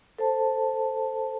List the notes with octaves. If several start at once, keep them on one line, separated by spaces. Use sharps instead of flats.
A4 C5 A5